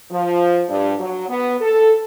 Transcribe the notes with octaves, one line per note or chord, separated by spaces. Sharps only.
F3
G2
F#3
B3
A4